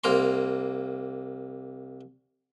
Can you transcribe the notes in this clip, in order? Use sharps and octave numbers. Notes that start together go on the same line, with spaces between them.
C2 A#3 A#5 C6